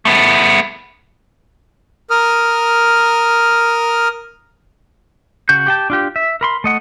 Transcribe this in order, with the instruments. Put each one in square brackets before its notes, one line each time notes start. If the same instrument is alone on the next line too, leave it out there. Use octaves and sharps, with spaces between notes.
[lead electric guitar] A3 B3
[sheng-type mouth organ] A#4 D#6 F6
[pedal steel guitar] C#3 F#4 G6
G4 G5 A5
D4 F4 G4
E5
A#4 B5 C6
A3 D#5 F#5